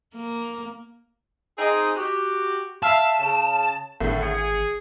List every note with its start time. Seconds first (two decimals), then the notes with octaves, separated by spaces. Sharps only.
0.15 A#3
1.58 C4 D#4 G#4
1.96 F#4 G4
2.83 E5 F5 A5
3.20 C#3
4.01 G#1 A2 D3
4.22 G#4 C#7